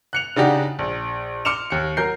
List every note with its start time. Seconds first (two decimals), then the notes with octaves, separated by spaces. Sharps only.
0.13 F#6 C#7 F7
0.36 C#3 D4 D#4 F#4 G4
0.79 A#1
1.45 C6 D6 F6 C#7 E7 F7
1.70 D#2 C#7
1.97 F#3 A#4 G6 C7